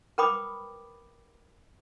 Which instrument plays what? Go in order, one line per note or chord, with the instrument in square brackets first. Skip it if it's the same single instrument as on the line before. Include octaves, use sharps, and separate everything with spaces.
[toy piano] A#4 B4 G5 B5 D6 D#6